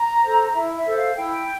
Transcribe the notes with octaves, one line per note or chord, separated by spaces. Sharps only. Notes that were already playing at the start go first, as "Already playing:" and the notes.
Already playing: A#5
A4 C5
E4 E5
E5
A4 C5
F5
E4 G5